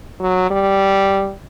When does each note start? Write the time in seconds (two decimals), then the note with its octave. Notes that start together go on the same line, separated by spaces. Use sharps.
0.20 F#3
0.51 G3